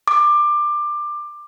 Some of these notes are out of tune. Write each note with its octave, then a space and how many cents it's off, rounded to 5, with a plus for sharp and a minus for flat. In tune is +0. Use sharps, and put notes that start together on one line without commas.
D6 +20